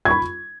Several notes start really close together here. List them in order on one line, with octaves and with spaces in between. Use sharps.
G#6 C#6 B5